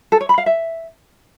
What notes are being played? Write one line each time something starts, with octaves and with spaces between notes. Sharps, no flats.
A4
C#5
B5
F5
E5